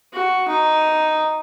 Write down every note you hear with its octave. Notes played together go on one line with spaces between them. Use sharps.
F#4
D#4